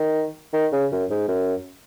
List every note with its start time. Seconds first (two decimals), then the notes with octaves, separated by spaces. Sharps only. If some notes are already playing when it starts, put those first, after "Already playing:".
Already playing: D#3
0.53 D#3
0.72 C#3
0.92 F#2
1.10 G#2
1.28 F#2